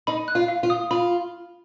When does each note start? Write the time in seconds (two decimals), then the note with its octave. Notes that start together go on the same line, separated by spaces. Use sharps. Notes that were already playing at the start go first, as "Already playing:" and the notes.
0.07 D#4 B5
0.28 F#6
0.35 F4
0.48 F5
0.63 F4
0.70 D#6
0.91 F4 B5